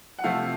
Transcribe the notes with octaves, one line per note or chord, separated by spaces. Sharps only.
F#5
C3 F3 A3 F5